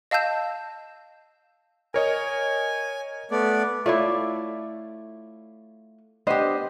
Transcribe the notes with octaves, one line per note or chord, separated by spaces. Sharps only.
D#5 F5 A5 E6 G6 E7
A#4 C#5 D#5 G#5
A3 B3 D5
A3 E4 F4 C#5 D5
B3 D4 G4 C5 D#5